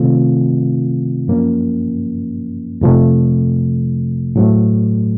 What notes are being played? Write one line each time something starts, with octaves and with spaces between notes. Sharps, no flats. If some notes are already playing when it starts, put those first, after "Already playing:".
Already playing: C3 D#3 A3 C4 F4
F#2 F3 A#3 C#4
F2 C3 F3 A3
A2 F#3 A3